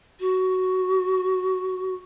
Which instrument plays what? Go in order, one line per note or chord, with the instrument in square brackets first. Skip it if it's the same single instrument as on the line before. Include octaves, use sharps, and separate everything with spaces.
[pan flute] F#4